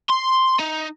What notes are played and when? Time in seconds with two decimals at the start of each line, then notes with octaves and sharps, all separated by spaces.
0.10 C6
0.60 D#4